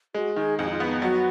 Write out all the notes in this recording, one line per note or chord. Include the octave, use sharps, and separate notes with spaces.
G#3 F#4
D#3 G#4
F2 G#4
D#4
F4
B3
D#4
F#3 F#4